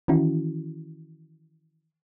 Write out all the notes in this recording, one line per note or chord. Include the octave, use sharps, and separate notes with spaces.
D#3 E3 C#4 E4 F#4